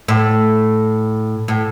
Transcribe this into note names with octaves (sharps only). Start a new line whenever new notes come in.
A2
A2